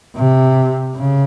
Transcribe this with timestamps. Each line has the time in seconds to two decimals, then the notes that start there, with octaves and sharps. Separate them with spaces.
0.16 C3
0.96 C#3